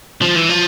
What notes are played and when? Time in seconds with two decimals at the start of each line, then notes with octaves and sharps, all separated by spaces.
0.22 F3
0.36 E3
0.49 F3